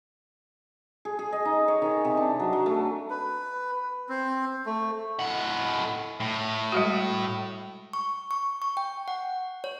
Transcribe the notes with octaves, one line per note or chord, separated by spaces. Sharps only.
G#4
G#4
D#5
D#4
C#5
D#3
C3
D4
F#3
F#3
A3
B4
C4
A3
A2 F#5
A2
G3 G#3 F#4
C#6
C#6
C#6
G5
F#5
C#5